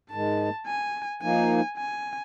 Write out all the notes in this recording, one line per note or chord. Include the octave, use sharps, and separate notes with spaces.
G#2 D#3 G#3 A5
G#5
F3 A#3 D#4 G#5
G#5